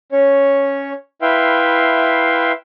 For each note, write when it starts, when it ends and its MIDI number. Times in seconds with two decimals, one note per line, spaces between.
0.12 0.93 61
0.12 0.93 73
1.22 2.52 64
1.22 2.52 71
1.22 2.52 76
1.22 2.52 77
1.22 2.52 79
1.22 2.52 84